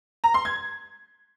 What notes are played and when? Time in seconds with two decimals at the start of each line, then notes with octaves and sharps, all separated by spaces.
0.24 A#5
0.34 C6
0.45 G#6